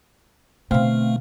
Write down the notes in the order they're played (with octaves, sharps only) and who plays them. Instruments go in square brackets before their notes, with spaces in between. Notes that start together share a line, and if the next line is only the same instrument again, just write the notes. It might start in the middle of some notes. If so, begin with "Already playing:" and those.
[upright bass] B2 D3 [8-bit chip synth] A3 [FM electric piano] C4 F5